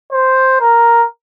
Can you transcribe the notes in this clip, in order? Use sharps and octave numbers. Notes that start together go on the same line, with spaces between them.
C5
A#4